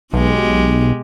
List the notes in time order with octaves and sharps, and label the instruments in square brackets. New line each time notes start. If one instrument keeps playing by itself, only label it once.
[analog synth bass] B1 [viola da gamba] B2 G#3 G4